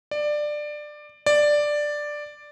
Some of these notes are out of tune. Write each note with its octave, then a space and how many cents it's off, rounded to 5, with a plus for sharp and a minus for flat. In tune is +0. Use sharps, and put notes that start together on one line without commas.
D5 +15
D5 +5